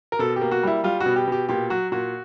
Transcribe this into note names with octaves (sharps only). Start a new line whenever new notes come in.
A#4
B2 A4
G4
A#3
F#4
G3 E4
G3 F4
F#4
B2
G4
B2 G4
A#2 G4
F#3 F#4
A#2 F#4